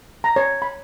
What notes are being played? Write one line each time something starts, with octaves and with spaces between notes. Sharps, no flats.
A#5
C#5
B5